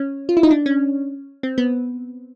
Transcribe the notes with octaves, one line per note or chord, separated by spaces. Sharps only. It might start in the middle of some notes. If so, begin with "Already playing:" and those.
Already playing: C#4
F4
E4
D#4
D4
C#4
C4
B3